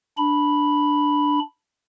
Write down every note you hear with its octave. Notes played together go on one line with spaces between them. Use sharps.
D4 B5